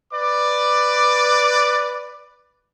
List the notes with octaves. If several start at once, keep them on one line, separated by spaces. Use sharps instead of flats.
B4 D5 D6